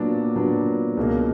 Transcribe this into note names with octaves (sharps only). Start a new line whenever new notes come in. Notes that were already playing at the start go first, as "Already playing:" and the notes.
Already playing: A#2 F#3 B3 D4
A#2 F#3 B3 D4
C#2 B2 A#3